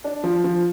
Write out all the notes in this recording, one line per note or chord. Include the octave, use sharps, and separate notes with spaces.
D4
F3
F3